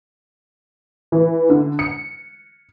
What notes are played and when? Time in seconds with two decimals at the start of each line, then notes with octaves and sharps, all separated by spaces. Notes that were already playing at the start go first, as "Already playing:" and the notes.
1.12 E3
1.50 D3
1.79 C#7